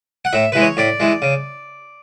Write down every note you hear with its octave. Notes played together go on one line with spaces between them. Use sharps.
F#5
A2 E5
E3 G#3 B4
C#5
A2 D5
E3 G#3
C#3